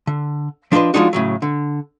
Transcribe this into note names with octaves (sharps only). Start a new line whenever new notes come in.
D3
F3 D4 F#4 B4 D#5 C6
F3 G3 G#3 D4 D#4 F#4
A2 C#3 F#3
D3